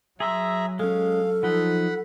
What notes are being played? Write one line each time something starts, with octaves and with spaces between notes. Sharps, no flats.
F#3 G#4 E5 A#5 C6 E6
G#3 C#4 A4 F5
F3 D#4 F#5 B5